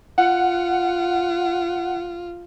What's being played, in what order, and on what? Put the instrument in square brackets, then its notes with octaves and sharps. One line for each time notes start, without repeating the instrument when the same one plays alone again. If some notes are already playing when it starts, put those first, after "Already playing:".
[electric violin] F4 [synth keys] F#5